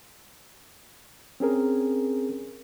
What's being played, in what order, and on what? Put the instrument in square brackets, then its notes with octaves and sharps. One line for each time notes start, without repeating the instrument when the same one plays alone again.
[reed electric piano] C4 C#4 G#4 A#4